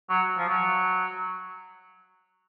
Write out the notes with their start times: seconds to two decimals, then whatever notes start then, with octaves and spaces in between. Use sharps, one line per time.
0.09 F#3
0.38 F3
0.49 F#3